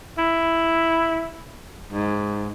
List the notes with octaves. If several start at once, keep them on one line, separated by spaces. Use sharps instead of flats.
E4
G#2